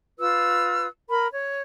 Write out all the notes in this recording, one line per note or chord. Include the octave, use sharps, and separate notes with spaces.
F4 B4 E6
A#4 B5
C#5